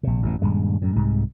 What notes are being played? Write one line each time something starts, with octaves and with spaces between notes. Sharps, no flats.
A#1 C3
A1 F#2 B2
D#1 G2 G#3
F#2 A2
C2 G#2 C3